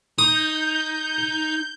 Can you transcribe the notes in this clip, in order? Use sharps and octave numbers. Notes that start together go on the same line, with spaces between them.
D#4 D#6 G6